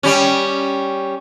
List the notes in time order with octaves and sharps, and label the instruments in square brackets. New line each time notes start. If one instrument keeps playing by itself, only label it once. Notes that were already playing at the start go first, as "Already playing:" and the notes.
[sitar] G3 C#4